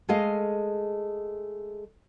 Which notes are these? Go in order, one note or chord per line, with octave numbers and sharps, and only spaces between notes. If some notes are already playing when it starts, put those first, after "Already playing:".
G#3 A3 G#4 D#5 F5